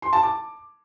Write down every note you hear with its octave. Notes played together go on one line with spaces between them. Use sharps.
C6
A5
D6